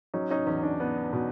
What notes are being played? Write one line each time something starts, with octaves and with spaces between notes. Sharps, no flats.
F#3 C#4 D#4
C#4 D#4
E2 C#4
D4
B3
B2